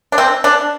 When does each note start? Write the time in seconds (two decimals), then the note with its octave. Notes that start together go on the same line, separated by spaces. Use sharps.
0.12 D4
0.18 C4
0.44 D4